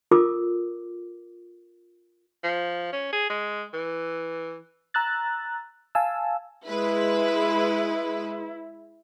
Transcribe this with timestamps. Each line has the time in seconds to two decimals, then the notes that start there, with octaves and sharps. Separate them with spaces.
0.11 F4 A4 A#4 D6
2.44 F3
2.93 C#4
3.13 G#4
3.30 G#3
3.73 E3
4.94 A#5 E6 F#6 A6
5.95 F5 G#5 A5 E6
6.68 G#3 E4 B4